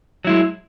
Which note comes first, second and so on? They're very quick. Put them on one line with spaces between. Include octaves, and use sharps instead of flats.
F#3 E4 G#3